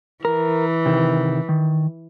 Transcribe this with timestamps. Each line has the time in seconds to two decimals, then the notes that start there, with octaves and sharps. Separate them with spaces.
0.25 E3 A#4
0.86 C3 D#3
1.49 D#3